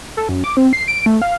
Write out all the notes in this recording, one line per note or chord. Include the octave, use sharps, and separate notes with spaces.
A4
F#2
D6
C4
C7
D7
A3
F5